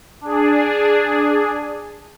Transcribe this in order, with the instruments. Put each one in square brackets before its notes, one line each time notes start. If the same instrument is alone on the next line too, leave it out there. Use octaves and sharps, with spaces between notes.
[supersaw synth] D4 G#4